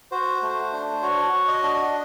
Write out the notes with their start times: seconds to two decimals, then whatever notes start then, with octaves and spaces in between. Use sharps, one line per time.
0.11 F#4 C5
0.42 A3
0.73 D4
1.02 F#4 C#5
1.33 F#4
1.48 D#5
1.63 D4